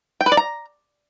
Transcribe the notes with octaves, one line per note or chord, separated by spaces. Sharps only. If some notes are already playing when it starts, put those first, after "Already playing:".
G5
B4
D5
A#5